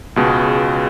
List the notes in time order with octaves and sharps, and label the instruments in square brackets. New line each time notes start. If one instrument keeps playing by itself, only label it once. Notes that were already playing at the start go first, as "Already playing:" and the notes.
[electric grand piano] C#2 B2 G#3